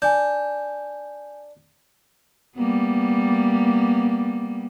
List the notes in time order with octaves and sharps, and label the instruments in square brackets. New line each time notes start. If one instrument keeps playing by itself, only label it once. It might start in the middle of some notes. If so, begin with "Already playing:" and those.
[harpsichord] D4 [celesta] G#5 G6
[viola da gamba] G3 A#3 B3